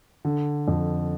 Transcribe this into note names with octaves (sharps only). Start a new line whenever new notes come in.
D3
F2